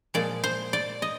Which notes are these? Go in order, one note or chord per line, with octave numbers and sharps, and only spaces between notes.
A#2 F3 G#3 D5
C5
D5
D#5